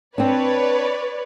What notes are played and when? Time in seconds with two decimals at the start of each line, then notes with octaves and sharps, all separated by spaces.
0.18 C4 D4 B4 C#5 D5